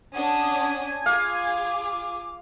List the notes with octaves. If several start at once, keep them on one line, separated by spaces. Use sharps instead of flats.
C#4 D4 F#5 G#5 D#6
F4 G#4 F5 D6